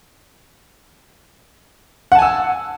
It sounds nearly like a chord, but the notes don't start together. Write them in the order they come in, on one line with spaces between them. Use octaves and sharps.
F#5 A5 G#5 E6